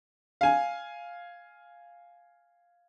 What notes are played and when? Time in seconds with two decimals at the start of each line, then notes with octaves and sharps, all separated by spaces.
0.41 F5 G#5